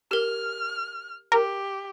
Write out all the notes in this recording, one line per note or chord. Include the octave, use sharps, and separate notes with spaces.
G4 A#4 F6
G4 A#4